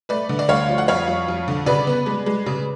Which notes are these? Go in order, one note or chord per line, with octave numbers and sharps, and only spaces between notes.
A3 B4 D5
D3
D5
D2 C#5 F5
F3
F#5
F2 C#5 F5
F2
F2
D3
C#3 B4 D5
B3
G#3
G#3
C#3